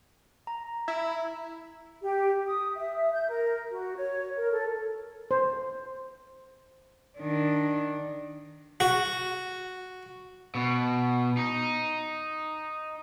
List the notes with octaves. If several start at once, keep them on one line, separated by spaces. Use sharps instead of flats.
A#5
E4
G4
D#6
E5
G6
A#4
F#4
C#5
A#4
A4
C5
D#3 D4
F#4
B2
D#4